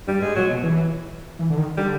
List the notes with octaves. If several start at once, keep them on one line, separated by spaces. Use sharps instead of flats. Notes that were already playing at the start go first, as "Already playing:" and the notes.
G2 G3
G#2 G#3
A#2 F#3
B2
E3
E3
D3
D#3
D3 G3